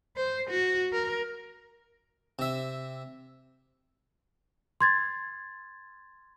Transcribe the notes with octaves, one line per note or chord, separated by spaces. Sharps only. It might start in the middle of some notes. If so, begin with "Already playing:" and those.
C5
F#4
A#4
C3 E5
C6 G#6 A6